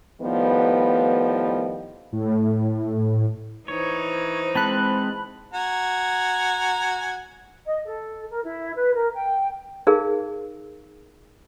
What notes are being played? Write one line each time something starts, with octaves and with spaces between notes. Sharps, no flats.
A2 D#3 F3 G3 B3
A2
E3 D#4 C5 C#5
G#3 C4 A5 B5 F#6
F#4 G#5 A#5
D#5
A4
A#4
E4
B4
A#4
G5
D#4 G#4 A#4 F5